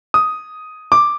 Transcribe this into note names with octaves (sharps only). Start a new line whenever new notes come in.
D#6
D6